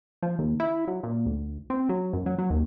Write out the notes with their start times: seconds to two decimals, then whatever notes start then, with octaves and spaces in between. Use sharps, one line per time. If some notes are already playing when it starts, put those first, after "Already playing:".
0.23 F3
0.39 D#2
0.60 E4
0.88 F#3
1.03 A#2
1.26 D2
1.70 C4
1.89 F#3
2.13 F#2
2.26 F#3
2.39 F#3
2.50 D#2